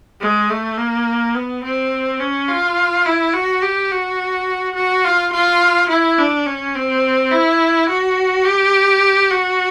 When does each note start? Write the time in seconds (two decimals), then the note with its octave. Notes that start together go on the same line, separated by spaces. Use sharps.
0.20 G#3
0.50 A3
0.77 A#3
1.35 B3
1.64 C4
2.20 C#4
2.48 F4
3.06 E4
3.34 F#4
3.62 G4
3.91 F#4
4.75 F#4
5.04 F4
5.33 F4
5.89 E4
6.18 D4
6.46 C#4
6.75 C4
7.31 E4
7.89 F#4
8.45 G4
9.30 F#4